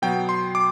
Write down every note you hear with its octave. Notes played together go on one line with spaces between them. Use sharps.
B2 F#3 B3 G5
C6
D6